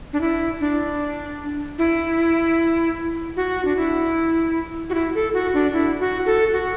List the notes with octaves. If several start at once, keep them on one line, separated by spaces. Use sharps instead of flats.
D4
E4
D4
E4
F#4
D4
E4
F#4
E4
A4
F#4
D4
E4
F#4
A4
F#4